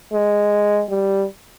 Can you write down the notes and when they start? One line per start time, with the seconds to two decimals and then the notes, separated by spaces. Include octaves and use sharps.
0.12 G#3
0.89 G3